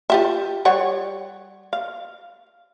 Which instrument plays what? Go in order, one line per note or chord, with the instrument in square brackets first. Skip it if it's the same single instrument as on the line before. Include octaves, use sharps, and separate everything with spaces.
[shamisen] F4 G4 E5
G3 C#5 F#5
F5